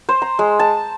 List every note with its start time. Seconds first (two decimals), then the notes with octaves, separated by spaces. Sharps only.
0.09 C5
0.22 A#5
0.39 G#3
0.59 A5